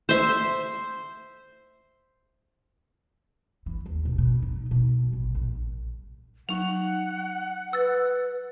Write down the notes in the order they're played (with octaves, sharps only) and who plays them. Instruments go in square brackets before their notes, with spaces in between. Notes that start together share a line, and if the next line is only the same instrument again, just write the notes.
[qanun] C5 E5
[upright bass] E3
D#2
B2
B2
D#4
B2
A1
A#1
[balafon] F#3 D#4 [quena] F#5 [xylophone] F7
[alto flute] B4 [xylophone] E6 A6